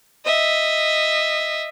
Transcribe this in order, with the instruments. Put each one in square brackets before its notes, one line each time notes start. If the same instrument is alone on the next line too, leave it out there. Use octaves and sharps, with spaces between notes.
[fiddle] D#5 E5